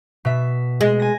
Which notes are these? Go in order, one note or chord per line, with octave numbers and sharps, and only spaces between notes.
B2 E5
G#3
G#5 A#6